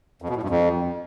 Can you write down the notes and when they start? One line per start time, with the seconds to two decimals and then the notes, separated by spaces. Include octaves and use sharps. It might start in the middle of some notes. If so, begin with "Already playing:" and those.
0.22 F2
0.29 B2
0.36 A2
0.43 G2
0.50 F2